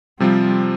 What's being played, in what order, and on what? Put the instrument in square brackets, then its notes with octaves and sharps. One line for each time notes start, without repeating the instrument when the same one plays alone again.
[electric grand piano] C3 F3 C4 F4 [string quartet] G3